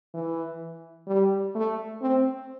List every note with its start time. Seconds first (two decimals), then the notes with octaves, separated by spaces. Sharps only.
0.14 E3
1.08 G3
1.55 A3
2.02 C4